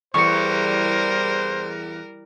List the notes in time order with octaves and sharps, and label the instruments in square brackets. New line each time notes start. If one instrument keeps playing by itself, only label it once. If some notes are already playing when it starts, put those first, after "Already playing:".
[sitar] E2 [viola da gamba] G3 A#4 [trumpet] C5 [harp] C#6 C#7